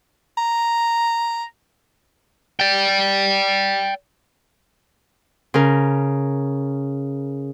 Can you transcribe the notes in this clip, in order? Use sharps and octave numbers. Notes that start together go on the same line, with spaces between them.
A#5
D5 G5
C#3 A#4